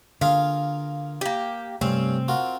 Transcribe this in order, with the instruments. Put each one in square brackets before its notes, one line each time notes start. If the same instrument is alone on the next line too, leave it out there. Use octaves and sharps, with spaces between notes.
[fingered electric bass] D3 [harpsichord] A#3 F4 G#4 [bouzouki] F5
[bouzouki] A#3 G4
[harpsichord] G2 C#4 [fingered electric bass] C3 A3 [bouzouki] C4
[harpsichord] F4 F#4 A#4